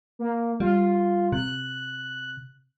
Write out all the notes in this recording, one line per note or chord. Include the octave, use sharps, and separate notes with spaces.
A#3
G3 F4
C3 F#6